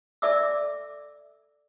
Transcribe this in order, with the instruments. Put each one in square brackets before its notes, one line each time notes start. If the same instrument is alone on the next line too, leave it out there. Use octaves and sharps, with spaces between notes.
[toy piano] A4 D5 E5 D6 E6